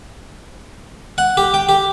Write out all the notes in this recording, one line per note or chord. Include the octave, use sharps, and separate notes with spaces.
F#5
G4
G5
G4